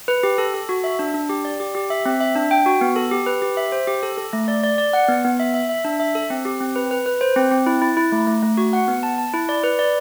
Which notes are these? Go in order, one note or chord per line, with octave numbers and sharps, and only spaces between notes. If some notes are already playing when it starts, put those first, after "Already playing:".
B4
G4
A4
A4
F#4
E5
D4
D4
G4
D5
G4
G4
E5
C4
E5
D4
G5
F#4
B3
A4
G4
B4
G4
E5
C5
G4
A4
A4
A3
D5
D5
D5
F#5
B3
B3
E5
E5
E5
D4
E5
A4
C4
G4
C4
B4
B4
B4
C5
C4
C4
E4
E4
E4
A3
A3
A3
F#4
F#5
B3
A5
A5
E4
D5
B4
D5